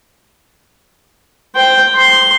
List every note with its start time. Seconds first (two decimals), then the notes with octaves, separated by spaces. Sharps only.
1.55 C5 G5
1.96 C6